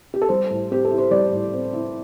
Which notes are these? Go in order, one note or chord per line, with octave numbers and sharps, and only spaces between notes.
G4
A4
G3 C5
A2
C4 G4
A4
E4
C5
G3 D5
A2
C4
E4